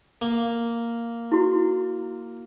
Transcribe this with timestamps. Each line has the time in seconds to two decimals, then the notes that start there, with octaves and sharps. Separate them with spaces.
0.22 A#3
1.32 E4 F#4